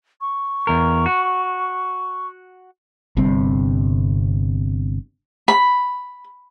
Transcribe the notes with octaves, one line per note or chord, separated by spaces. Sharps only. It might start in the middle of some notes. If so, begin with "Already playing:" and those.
C#6
E2 A#4
F#4
G1 G2 C3 C4
B5